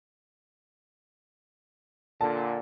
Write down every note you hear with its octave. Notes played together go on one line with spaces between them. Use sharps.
A#2 D3 A5